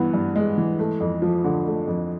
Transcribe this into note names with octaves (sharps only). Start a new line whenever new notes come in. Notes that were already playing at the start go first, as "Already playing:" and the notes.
Already playing: G2 E3 B3
G2
G#3
E3
A3
F2
F3
D3
A3
F2